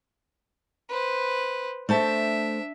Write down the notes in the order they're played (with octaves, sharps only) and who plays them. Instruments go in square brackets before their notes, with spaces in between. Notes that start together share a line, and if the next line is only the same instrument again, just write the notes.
[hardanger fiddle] B4 C5
[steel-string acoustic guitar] A3 C5 A5 [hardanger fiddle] D4 E5